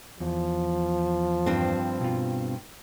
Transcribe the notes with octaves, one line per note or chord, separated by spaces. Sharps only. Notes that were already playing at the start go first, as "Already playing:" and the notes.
E2 F3
G2 C4
B2 F4